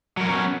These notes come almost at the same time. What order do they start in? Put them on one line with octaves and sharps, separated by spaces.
F#3 A#4 F#4 C#4 B3